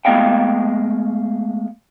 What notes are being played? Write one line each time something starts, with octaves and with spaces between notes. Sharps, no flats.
G#3 A3 B3 D#5 F5 G5